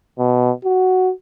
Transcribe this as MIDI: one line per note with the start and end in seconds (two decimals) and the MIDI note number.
0.19 0.51 47
0.65 1.12 66